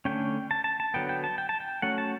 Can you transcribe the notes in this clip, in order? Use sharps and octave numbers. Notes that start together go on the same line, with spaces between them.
D3 A3 C#4 G5
A5
A5
A5
D3 F#3 B3 G5
G5
A5
G5
A5
G5
F#3 A3 C#4 F#5
A5